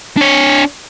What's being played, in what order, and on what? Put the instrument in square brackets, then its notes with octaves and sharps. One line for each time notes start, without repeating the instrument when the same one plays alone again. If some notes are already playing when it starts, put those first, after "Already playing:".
[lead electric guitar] D4 C#5